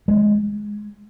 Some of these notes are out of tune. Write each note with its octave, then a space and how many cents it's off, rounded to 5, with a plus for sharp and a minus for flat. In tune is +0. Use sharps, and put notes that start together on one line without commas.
G#3 +5